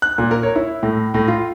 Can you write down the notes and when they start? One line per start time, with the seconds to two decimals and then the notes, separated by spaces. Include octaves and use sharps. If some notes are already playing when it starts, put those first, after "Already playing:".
0.02 F#6
0.18 A#2
0.31 A#4
0.43 C#5
0.56 E4
0.83 A2
1.14 A2
1.28 F4